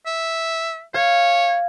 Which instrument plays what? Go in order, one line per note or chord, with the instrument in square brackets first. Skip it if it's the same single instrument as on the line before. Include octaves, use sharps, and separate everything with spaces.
[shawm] E5
[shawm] C#5 [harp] F5 G#6